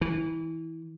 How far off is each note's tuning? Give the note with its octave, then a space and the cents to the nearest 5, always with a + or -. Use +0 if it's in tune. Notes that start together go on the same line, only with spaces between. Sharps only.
E3 -20